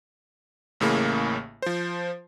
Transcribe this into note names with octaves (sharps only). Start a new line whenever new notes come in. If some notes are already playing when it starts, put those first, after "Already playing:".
A1 A2 C#3 A#3
F3 C5